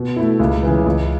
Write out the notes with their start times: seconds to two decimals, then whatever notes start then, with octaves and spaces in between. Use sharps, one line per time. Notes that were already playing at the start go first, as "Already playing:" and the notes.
Already playing: B2
0.16 A3 E4
0.40 C#2
0.63 C#3 E3
0.86 C#2